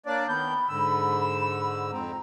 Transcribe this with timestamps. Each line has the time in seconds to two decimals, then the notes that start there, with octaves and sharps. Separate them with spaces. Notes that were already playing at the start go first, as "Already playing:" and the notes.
0.06 A#3 D4 C#5 D5
0.28 D#3 B3 B5 G6
0.69 G#2 D3 E6
1.92 F2 C4 A#5